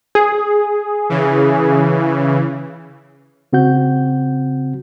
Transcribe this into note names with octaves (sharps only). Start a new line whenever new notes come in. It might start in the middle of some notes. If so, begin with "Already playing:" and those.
G#4
C#3 E3
C#3 C4 F#4 F#5 G6